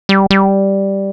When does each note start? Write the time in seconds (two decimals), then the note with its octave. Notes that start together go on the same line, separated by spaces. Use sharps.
0.09 G3
0.31 G3